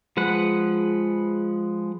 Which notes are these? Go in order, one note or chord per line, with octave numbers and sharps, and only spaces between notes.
F3 G#3 B4 F#5